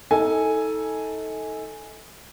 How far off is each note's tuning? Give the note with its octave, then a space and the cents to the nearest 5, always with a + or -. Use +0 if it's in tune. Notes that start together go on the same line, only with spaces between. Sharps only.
D#4 +35 A4 +0 G#5 +0